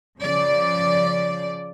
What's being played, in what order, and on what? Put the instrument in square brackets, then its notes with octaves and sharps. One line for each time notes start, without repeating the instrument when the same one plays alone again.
[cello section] C#3 F3 D5